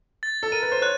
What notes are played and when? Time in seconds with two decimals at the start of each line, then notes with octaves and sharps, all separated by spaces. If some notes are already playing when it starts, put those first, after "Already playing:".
0.23 A6
0.43 A4
0.52 A#4 D#7
0.62 B4
0.72 C5
0.82 C#5 F#6